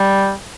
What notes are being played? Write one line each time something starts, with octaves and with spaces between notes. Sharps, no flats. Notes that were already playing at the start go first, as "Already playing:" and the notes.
Already playing: G3